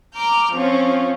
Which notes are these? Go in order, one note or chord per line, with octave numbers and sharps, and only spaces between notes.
A#5 D6 F6 G6
F3 C4 C#4 F4